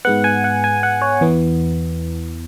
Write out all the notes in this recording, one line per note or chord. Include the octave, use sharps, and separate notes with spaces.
G#2 G#3 B3 F#5
G#5
F#5
G#5
F#5
C#5
E2 E3 B3